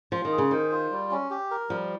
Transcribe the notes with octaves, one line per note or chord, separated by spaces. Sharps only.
F3 F4
D#3
G#4
C#3
D#3 C5
F4
G3
C#4
G4
A#4
F3 G3